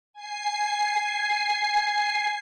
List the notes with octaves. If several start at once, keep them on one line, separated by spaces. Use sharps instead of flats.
G#5 C7